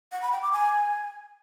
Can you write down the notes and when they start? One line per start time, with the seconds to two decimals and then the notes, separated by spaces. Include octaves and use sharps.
0.12 F#5
0.22 B5
0.32 G5
0.42 D6
0.52 G#5